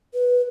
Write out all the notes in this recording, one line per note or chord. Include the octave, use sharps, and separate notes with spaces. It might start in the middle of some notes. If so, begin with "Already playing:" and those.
B4